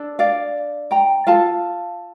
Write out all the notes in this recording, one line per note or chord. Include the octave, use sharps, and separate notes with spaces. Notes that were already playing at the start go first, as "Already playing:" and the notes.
Already playing: D4 A4
D5 F5
G5 A#5
F4 A4 F5 A5